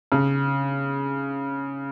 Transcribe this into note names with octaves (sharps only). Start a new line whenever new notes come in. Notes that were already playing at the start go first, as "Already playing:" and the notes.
C#3